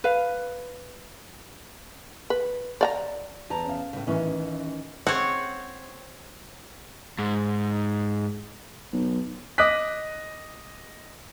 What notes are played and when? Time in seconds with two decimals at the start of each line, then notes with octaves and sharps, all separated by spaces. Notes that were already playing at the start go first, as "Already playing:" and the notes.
0.04 B4 F5
2.30 B4
2.81 D5 F5 A#5
3.50 E2 A5 A#5
3.65 C#4 F5
3.93 A2 C#3
4.07 A1 D#3 E3 C#4 C#6
5.07 C4 C#5 F#5
7.19 G#2
8.93 B1
9.58 D#5 D6 D#6 F#6 B6